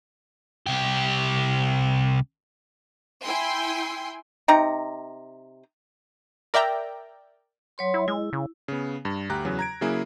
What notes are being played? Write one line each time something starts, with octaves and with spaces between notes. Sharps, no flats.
C2 G4
E4 G5 G#5 C6
C3 D#4 A#5
A#4 D5 E5 G5 A#5
F#3 C#5 C6
E4
G#3 E4
C#3
C#3 B3
G2
D2 G4 A#5 F#6
E2 C#3 F#3
A#5 G#6 D7
C#3 F#3 A#3 E4 G#4